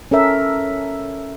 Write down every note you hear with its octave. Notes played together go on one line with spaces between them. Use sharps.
C#4 A4 A#4 E5